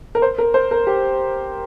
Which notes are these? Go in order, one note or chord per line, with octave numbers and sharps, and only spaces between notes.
A#4
C5
A#4
C5
A#4
G4